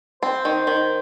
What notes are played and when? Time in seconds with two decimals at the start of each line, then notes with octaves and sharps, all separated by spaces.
0.23 C4 C5
0.45 D#3
0.67 D#3